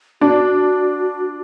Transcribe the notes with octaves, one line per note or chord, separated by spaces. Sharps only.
D4 F#4